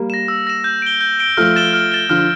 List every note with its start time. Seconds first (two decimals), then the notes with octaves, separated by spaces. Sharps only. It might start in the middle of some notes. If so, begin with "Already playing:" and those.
Already playing: G3 A#3
0.10 A#6 E7
0.28 E6
0.47 A#6 E7
0.64 G6
0.82 D7 G7
1.01 G6
1.20 D7 G7
1.37 F3 A3 F6
1.56 A6 E7 G7
1.73 F6
1.92 A6 E7 G7
2.09 D3 F3 F6